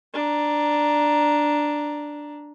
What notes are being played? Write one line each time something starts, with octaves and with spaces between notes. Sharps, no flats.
D4 A#5